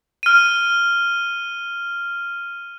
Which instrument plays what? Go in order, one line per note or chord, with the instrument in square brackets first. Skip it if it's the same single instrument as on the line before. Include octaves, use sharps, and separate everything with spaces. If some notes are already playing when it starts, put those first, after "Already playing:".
[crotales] F6 D#7